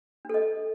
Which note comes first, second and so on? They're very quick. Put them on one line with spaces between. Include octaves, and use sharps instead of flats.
D4 A4 D#5